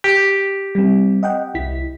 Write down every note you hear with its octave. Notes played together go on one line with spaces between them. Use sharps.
G4
G3 C4
D#5 F#5 G5
C2 E4 B6